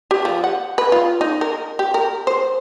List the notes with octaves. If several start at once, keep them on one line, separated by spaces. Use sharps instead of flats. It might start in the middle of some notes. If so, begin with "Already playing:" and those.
G4
F3
F#5
B4
F4
D#4
A#4
G4
A#4
C5